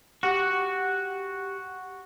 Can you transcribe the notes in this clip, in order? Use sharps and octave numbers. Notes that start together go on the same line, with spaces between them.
F#4 G4 F#5